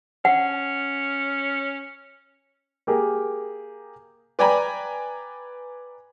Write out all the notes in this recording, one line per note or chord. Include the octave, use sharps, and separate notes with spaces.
C#4 F#5
A#3 G4 G#4 A#4
B4 D5 G5 G#5 A#5 B5